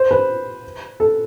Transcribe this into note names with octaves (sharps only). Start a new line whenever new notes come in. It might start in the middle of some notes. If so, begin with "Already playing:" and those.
Already playing: C5
B4
A4